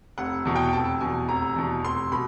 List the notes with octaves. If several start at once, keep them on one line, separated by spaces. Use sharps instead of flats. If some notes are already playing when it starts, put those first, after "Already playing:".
F1 F#5
E2 B2
G5
F1 A5
E2 B2 G#5
F1 A#5
E2 B2
F1 C6
B2 B5